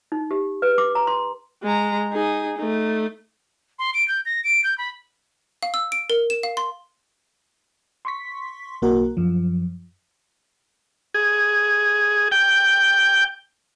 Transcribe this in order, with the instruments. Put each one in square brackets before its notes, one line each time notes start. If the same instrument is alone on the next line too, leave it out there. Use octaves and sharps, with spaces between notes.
[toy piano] D#4
G4
B4
D6
A#5
C6
[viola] G#3 A#5
D#4 G#4
A3 D#4
[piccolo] C6
D7
G6
A#6
D7
G6
B5
[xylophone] F5
E6
D7
A#4
E7
F5
C6
[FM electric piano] C6 C#6 B6
B1 A#3 F#4 A#4 F#5
F#2 F3
[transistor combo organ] G#4
G5